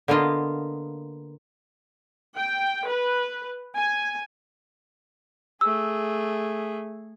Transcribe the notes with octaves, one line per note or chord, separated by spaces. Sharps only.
D3 A#3 B3 F4 D#5
G5
B4
G#5
A3 G#4 E6